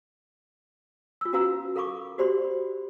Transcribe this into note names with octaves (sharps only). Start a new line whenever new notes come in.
F4 E6
C#4 F#4 B4 F5 A#5 E6
A4 A#4 F5 B5 C#6 D6
F#4 G4 C5 D5 B5 C6